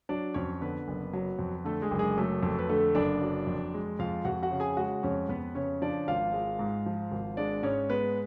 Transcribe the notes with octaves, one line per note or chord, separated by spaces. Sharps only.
F#3 D4 D5
F2 C#4 C#5
D3 B3 B4
F#1
F#3
F2
D3 A3 A4
G#3 G#4
F#1
G#3 G#4
F#3 A3 A4
F2 A3 A4
B4
D3 A3 A4
F#1 D4 D5
F#3
F2
G#3
F2 F4 F5
F2 F#4 F#5
F#4 F#5
C#3
G#4 G#5
G#3 F#4 F#5
F2 C#4 C#5
F2 B3 B4
C#3 C#4 C#5
F3 D4 D5
G#1 F4 F5
G#3
G#2
F3
G#1
G#3 D4 D5
G#2 C#4 C#5
G#3 B3 B4